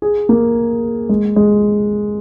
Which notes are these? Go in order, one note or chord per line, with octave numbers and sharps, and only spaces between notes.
G#4
A#3
G#3
G#3